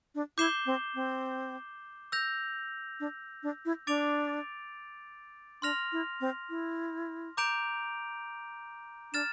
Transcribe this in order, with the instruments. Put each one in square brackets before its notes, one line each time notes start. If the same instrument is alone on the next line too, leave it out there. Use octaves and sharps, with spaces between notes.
[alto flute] D4
[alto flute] E4 [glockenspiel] D6 G6 C7 E7 G7
[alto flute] C4
C4
[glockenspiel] E6 G6 A#6 F7
[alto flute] D4
D4
E4
[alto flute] D4 [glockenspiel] D6 A6 D7 F7
[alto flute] D4 [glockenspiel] C6 F6 A#6 F7
[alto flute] E4
C4
E4
[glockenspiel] A#5 D6 G6 D7 F7
[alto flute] D4 [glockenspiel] F6 A6 E7